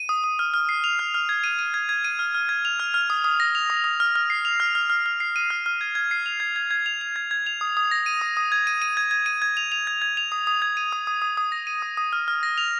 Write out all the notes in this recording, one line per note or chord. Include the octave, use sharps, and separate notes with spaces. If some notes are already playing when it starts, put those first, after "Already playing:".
Already playing: D#7
D#6
D#6
F6
F6
C7
F7
F6
F6
G#6
D#7
D#7
G#6
G#6
D#7
F6
F6
G#6
F7
F6
F6
D#6
D#6
A#6
F7
D#6
D#6
F6
F6
C7
F7
F6
F6
F6
F6
C7
D#7
F6
F6
G#6
G#6
C7
F7
G#6
G#6
G#6
F7
F7
G#6
G#6
F7
D#6
D#6
A#6
D#7
D#6
D#6
G#6
D#7
D#7
G#6
G#6
D#7
G#6
F7
F7
G#6
G#6
F7
D#6
D#6
G#6
D#7
D#6
D#6
D#6
D#6
A#6
D#7
D#6
D#6
F6
F6
A#6
F7